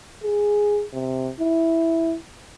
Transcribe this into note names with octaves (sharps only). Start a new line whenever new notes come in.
G#4
C3
E4